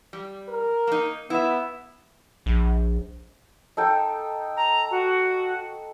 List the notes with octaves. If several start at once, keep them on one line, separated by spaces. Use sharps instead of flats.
G3
A#4
A#3 D#4
B3 E4 E5
A#1
D#4 A4 G5
A#5
F#4